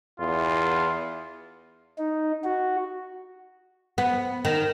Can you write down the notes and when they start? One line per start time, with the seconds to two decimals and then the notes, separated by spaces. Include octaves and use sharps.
0.20 E2 F4
1.99 D#4
2.44 F#4
3.98 B3
4.45 D#3